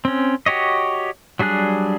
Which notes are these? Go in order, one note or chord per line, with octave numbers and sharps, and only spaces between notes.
C4 C#4
F#4 G4 C#5 D#5
F#3 G3 D4 G#4 F#6